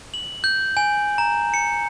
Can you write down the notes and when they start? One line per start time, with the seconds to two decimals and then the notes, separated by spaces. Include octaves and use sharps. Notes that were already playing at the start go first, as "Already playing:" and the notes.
0.14 F#7
0.44 G6
0.77 G#5
1.18 A#5
1.54 C#7